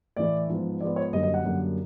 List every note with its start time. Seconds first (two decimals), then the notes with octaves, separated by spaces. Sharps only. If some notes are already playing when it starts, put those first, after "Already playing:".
0.16 A2 E3 A3 D5
0.48 G#2 F3 G#3 B3
0.81 G#2 F3 G#3 B3 D5
0.96 C#5
1.13 F#2 D3 G3 A#3 D#5
1.23 D#5
1.34 F#5
1.45 F#2 D3 G3 A#3